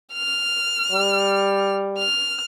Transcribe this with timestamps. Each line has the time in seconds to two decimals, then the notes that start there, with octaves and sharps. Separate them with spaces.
0.13 F6
0.92 G3
1.98 F6